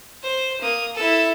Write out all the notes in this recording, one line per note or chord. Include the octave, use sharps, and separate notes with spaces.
C5
A#3 D#6
E4 A4